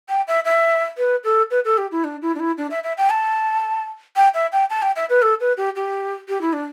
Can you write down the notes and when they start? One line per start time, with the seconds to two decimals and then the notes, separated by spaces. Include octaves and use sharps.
0.09 G5
0.28 E5
0.45 E5
0.97 B4
1.24 A4
1.51 B4
1.65 A4
1.78 G4
1.92 E4
2.04 D4
2.22 E4
2.35 D4
2.40 E4
2.58 D4
2.71 E5
2.84 E5
2.98 G5
3.10 A5
4.16 G5
4.34 E5
4.52 G5
4.70 A5
4.82 G5
4.96 E5
5.10 B4
5.22 A4
5.40 B4
5.57 G4
5.76 G4
6.28 G4
6.41 E4
6.53 D4